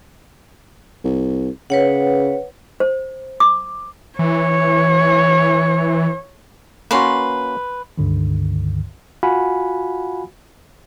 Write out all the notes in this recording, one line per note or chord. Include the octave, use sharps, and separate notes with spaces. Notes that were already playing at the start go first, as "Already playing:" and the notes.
C2
C#3 B4 C#5 F#5
C5
D6
E3 C#5
A#3 C#4 F#4 B4 C6
C#2 G2 D3 D#3
F4 F#4 F5 F#5 G#5 B5